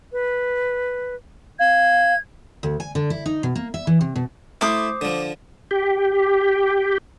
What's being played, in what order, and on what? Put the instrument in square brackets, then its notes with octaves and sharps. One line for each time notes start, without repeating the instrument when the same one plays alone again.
[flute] B4
[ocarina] F5 [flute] G#6
[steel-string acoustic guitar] D2
G#5
D3
E4
D#4
B2
A#3
E5
E3
C3
B2
[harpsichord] A3 E4 [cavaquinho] C5 D6 D#6
[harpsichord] D3 F3
[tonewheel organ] G4